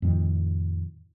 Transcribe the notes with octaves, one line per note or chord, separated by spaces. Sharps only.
F2 A2 D#3